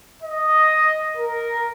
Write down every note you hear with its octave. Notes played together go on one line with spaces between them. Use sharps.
D#5
A#4